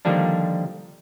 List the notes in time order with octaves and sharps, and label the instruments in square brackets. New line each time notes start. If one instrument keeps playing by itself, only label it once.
[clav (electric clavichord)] D3 D#3 F3 G3 A#3 D4